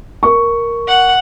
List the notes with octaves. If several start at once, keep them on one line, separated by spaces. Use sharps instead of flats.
A#4 C#6
F#5